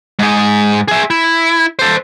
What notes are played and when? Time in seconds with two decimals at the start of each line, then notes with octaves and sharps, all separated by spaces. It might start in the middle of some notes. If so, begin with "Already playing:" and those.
0.19 G#2 G#4
0.88 G#4 E5
1.10 E4
1.79 A4 C5